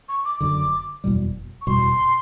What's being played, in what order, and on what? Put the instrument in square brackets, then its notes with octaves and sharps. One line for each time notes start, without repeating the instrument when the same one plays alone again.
[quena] C#6
D6
[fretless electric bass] F#1 F#2 D3 [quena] D6
[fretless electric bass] F#1 E2 B2 G3
[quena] C#6
[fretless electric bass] F#1 E2 B2 G3 [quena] C6